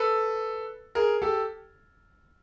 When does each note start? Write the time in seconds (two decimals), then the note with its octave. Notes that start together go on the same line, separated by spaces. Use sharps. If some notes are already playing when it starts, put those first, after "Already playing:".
Already playing: A4 B4
0.95 G#4 A#4
1.22 G4 A4